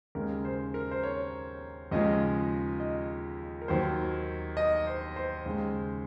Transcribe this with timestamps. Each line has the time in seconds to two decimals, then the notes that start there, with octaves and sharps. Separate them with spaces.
0.15 D#2 C#3 G#3 A#4
0.45 C5
0.74 A#4
0.91 C5
1.03 C#5
1.91 D#2 C#3 F3 G#3 D#5
2.80 D#5
3.62 A#4
3.68 D#2 D#3 F#3 C5
4.57 D#5
4.87 C5
5.16 C5
5.46 D#2 C#3 G#3